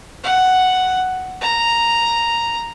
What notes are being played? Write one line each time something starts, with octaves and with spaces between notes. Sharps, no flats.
F#5
A#5